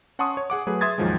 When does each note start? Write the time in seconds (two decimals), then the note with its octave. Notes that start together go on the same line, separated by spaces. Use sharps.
0.19 C#4 F#5 A5 C6 C#6 D#6
0.37 C#5
0.50 G#4 F#5 D6
0.67 F#3 A3 G#4 B4
0.81 E5 C6 D#6 G#6 A6
0.98 D#2 G#2 D#3 F3 F#3 G#3